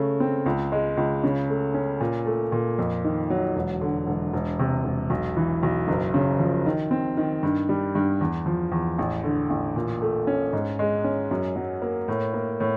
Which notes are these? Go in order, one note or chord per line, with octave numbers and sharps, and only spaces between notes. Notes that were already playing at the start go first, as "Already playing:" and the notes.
Already playing: C#3 A3
C4
C#2
G#3
C#2
C#3
A3
C#4
A#2
A3
A#2
F2
D#3
F#3
E1
D3
E1
E1
C3
E1
B1
E3
B1
F#1
C#3
F3
D#3
C4
D#3
G2
G3
G2
E2
F3
E2
A1
D3
A1
A#2
A3
C#4
G#2
G#3
C#4
F#2
F#3
A#3
A2
A#3
A2